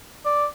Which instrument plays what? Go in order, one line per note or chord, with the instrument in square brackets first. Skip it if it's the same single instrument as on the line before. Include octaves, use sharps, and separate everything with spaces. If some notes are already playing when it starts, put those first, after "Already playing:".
[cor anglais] D5